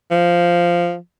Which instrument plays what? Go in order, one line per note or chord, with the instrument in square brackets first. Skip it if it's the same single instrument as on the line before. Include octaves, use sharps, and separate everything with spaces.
[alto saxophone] F3